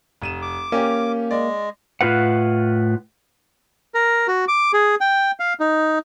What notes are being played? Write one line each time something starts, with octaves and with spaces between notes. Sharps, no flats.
F1 D#7 E7
D6
A#3 C#4 G4
G#3 D5
A2 F4 B4 F#5
A#4
F#4
D6
G#4
G5
F5
D#4